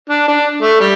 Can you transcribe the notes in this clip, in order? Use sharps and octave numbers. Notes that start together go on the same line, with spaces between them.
D4
D4
A3
G3